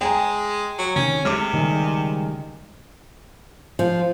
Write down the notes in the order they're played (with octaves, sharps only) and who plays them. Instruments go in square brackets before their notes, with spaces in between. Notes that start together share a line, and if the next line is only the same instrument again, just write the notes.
[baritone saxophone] G#3 [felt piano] G5 G#5 A#5
[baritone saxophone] F#3
[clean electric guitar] D2 C3 D#3 [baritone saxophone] C#4
[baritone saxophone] C3 [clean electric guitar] G#3 A3 [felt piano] D6 F6
[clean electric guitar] C#2 G3 G#4 [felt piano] D#3
[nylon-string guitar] F3